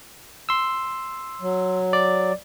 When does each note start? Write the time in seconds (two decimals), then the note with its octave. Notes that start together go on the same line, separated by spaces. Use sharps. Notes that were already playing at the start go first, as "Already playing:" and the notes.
0.49 C6 E6
1.41 F#3
1.93 D5